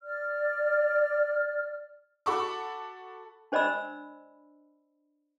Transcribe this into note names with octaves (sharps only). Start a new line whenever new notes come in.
D5 F6
F#4 A4 A5 B5 C#6 D6
D4 C5 D5 D#5 B5 E6